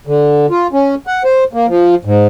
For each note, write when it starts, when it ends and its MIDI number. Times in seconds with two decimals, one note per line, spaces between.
0.07 0.46 50
0.50 0.67 65
0.73 0.95 61
1.07 1.23 78
1.24 1.44 72
1.53 1.66 58
1.68 1.95 53
2.05 2.27 44